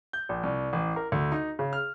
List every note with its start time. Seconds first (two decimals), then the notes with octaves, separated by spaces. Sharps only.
0.13 G6
0.29 A#1
0.43 C2
0.73 A1
0.96 A#4
1.12 D2
1.32 D#4
1.59 C#3
1.73 F6